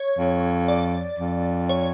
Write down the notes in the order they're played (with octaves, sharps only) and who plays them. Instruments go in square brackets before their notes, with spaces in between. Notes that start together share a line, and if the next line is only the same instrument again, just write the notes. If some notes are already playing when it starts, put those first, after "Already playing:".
Already playing: [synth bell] C#5
[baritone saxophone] F2
[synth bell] D5
[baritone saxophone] F2
[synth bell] C#5